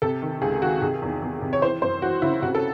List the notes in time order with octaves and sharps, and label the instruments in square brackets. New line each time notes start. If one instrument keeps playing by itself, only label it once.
[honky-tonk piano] C3 A4
D#3
C#2 G#4
D#3 F#4
C3 G#4
E2
E2
C3
C#5
E3 C5
F#2 C5
E3 F#4
C#3 E4
C3 F#4
A4